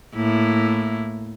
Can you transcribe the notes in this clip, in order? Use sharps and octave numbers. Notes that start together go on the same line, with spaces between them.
A2 A#3 E4